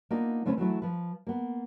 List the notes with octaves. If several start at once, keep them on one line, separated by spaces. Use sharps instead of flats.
A#3 B3 D4 D#4 F4
D3 A3 C4 C#4 A4 B4
E3 F#3 A3 E4
F3 B4
A#3 B3